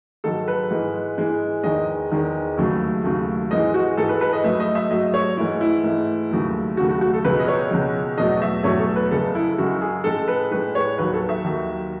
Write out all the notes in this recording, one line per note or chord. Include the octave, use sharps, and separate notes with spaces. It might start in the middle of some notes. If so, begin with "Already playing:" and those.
G#2 D#3 F#3 A4
B4
G#2 E3 G#3
G#2 E3 G#3
E2 D#3 G#3 D#5
E2 D#3 G#3
D#2 C#3 F#3 A3
D#2 C#3 F#3 A3
G#2 E3 G#3 D#5
F#4
G#2 E3 G#3 A4
B4
B4
D#5
G#2 F#3 A3 E5
D#5
E5
G#2 F#3 A3 D#5
C#5
G#2 E3 A3 E4
E4
G#2 E3 A3
D#2 C#3 F#3 A3
D#2 C#3 F#3 A3 F#4
F#4
F#4
A4
C#2 B2 G#3 B4
D#5
C#5
C#2 B2 G#3
E2 B2 F#3 A3 D#5
E5
E2 B2 F#3 A3 C#5
A4
B4
F#2 C#3 G#3 A4
E4
F#2 C#3 G#3 F#4
G#4
A2 G#3 A4
B4
A2 G#3 B4
C#5
D#2 D#3 F#3 B4
A4
E5
D#2 D#3 F#3